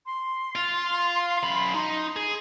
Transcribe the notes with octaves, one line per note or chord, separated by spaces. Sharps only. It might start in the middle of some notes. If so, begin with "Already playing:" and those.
C6
F4
F#2 B5
D#4
G#4